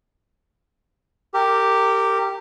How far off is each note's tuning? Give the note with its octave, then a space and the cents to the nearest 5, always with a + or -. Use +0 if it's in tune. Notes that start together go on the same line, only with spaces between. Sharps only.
G4 +0 A#4 -30